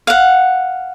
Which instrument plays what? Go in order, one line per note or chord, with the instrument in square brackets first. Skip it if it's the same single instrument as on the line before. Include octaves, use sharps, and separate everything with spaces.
[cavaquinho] F5 F#5